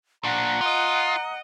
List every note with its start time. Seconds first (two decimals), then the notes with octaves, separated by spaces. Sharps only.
0.24 A#2 D4 F#5 A#5
0.61 F4 D#5